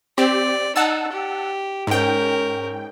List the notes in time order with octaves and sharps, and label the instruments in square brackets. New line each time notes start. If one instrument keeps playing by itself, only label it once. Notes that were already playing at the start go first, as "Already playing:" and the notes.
[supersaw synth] C4 G4 [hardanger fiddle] D5
[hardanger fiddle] D#4 [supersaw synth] F#5 A5 E6
[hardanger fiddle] G4
[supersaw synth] G#2 G5 [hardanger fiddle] C#4 A#4